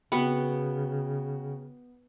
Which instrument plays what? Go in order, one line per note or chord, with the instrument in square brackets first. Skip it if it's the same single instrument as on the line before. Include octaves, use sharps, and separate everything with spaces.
[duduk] C#3 [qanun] B3 [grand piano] F#4 G5 [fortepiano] B5